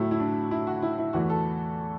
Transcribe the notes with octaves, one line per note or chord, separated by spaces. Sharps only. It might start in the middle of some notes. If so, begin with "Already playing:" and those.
Already playing: A2 F#3 A3 E4
E4
D4
E4
F#4
E4
E4
E2 E3 A3 F#4
A4